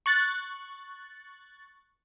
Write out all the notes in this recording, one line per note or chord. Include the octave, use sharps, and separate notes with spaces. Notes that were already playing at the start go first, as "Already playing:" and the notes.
C#6 F#6 A6